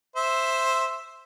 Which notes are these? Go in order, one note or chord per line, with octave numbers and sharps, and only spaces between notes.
C5 E5